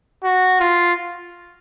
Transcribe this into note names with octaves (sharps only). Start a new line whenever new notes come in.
F#4
F4